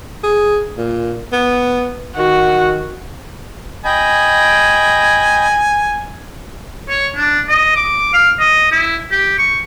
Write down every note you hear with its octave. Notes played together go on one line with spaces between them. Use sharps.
G#4
A#2
B3
D#3 F#4
D#5 G5 G#5 B5
C#5
D4
D#5
D6
F5
D#5
E4
G4
C#6